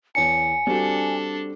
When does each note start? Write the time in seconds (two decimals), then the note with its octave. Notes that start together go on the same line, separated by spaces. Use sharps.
0.15 E2 C#5 G#5 A5 C#7
0.67 G3 C4 D4 F#4 A4